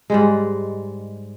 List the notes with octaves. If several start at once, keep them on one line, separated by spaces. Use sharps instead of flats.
G#2 G3 G#3